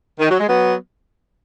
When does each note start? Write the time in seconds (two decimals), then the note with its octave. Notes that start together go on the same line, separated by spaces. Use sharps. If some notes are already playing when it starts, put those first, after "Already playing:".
0.19 D#3
0.29 F#3
0.39 G#3
0.48 F#3 B3